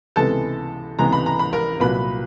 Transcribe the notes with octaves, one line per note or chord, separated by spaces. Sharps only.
C#2 C3 E3 G#3 B3 A4 A5
C#2 C3 E3 G#3 B3 A#5
B5
A#5
B5
A#4 A#5
C2 A#2 F#3 B4 B5